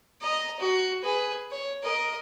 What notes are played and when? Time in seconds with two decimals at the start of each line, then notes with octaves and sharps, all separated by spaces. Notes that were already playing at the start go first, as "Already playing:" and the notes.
0.21 D#5 A#5
0.60 F#4
1.03 G#4 B4
1.51 C#5
1.83 A#4 D#5